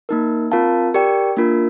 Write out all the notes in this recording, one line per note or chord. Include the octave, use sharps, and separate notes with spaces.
A#3 D#4 A#4
C4 F4 A#4 F5 A5
G4 A#4 D5 G5
A#3 D4 F4 A#4